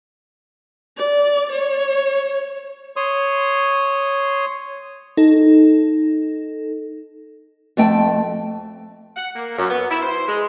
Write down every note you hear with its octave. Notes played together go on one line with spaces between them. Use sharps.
D5
C#5
C#5 C6 D#6
D#4 A4
F2 A3 G5 A5
F#5
A#3
F#2
B3
E4
C5
G#3